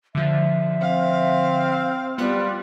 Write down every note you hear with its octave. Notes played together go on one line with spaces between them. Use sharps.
D3 F3 E5
C4 F5
G3 B3 F4 F#6